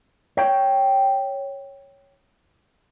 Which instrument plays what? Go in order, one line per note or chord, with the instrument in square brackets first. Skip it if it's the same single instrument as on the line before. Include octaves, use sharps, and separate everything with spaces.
[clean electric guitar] C#5 G5